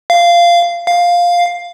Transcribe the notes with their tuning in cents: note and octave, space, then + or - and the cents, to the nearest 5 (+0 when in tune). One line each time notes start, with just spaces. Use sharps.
F5 -15
F5 +5